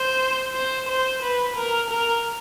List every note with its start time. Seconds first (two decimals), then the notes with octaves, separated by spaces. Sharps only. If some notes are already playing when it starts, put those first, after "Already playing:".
Already playing: C5
0.55 C5
0.88 C5
1.23 B4
1.56 A#4
1.90 A#4